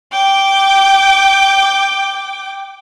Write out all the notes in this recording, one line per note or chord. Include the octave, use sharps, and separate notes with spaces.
G5 D6